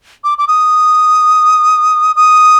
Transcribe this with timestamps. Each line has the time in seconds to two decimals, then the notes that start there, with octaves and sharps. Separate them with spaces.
0.24 D6
0.38 D6
0.48 D#6
2.16 D#6